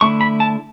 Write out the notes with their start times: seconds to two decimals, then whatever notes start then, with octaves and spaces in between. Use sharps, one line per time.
0.01 D3 A3 E4 C#6
0.21 B5
0.40 A5